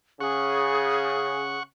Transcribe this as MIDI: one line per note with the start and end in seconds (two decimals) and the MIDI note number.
0.21 1.63 49
0.21 1.63 61
0.21 1.58 68
0.21 1.63 78
0.21 1.63 85